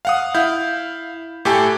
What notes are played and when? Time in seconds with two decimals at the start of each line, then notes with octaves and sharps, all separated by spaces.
0.05 F5 F#5 D#6
0.35 E4 F5 G6
1.45 A2 G4 A4 G#5